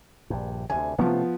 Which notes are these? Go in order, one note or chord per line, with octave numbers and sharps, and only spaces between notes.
A#1 G2
D2 C3 G#5
C3 F3 A3 B3 C#4